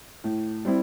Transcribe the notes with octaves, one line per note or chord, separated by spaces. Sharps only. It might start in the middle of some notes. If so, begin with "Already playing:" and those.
A2
G3 C4 E4